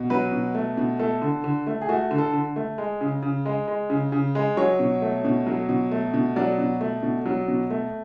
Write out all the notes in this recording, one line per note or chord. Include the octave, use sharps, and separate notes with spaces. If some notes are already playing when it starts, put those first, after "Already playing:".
Already playing: B2
F#3 B4
B2
A3
B2
A3 A4
D3
D3
A3
G#4
A3 F#4
D3
A4
D3
A3
G#3
C#3
C#3
G#3
G#3
C#3
C#3
G#3
F#3 C#5
B2
A3
B2
F#3
B2
A3
B2
F#3 D5
B2
A3
B2
F#3
B2
A3